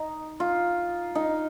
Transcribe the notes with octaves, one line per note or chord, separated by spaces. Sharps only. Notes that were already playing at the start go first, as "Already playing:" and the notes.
Already playing: D#4
F4
D#4